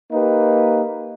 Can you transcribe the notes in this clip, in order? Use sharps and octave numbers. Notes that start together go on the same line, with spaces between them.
A#3 D#4 G4 B4